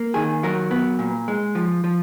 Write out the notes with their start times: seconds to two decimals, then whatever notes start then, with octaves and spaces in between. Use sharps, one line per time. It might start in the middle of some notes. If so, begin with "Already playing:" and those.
Already playing: A#3
0.14 D#3 G#4
0.43 F#3 A#4
0.71 B3
0.99 A#2
1.28 G#3
1.55 F3
1.84 F3